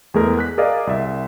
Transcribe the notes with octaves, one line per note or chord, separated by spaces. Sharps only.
E2 G#3 A3 G#4 A#4
F#6 B6
G#4 A#4 D5 D#5 F5
C2 E5